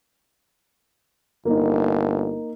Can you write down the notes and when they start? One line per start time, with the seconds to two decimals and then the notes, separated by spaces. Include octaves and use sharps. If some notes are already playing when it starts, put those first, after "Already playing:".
1.45 G1 A#3 D#4